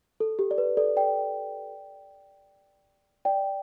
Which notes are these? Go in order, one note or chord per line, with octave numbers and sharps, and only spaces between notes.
A4
G4
D5
B4
A4 D5
D5 G5
D5 G5